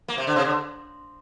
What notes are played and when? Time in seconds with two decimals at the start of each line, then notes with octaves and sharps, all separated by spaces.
0.08 A#3
0.18 C3
0.27 D3
0.36 C3
0.45 D3